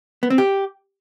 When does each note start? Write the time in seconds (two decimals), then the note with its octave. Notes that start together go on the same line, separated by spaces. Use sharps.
0.23 B3
0.30 C4
0.38 G4